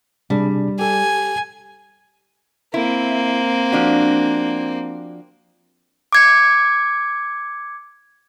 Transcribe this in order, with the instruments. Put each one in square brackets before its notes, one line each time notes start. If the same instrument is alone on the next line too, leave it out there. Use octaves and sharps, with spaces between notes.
[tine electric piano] C3 D4 G#4 [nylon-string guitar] G3
[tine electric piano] G4 A4 [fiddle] G#5
[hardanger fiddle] A#3 C4 [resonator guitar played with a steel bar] E4
[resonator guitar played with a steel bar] F3 D4 F#4
[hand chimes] D6 G#6 C#7